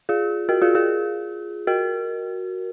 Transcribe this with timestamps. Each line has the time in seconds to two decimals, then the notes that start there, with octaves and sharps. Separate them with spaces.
0.09 F4 G#4
0.49 F#4 A#4
0.62 F4 G#4
0.75 F4 G#4
1.67 F#4 A#4